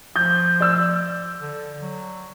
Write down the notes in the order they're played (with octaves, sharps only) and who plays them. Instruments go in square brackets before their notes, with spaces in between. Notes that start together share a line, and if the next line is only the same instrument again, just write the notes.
[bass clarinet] F3 [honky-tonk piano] G6
[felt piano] D5 E6
[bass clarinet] D3
F#3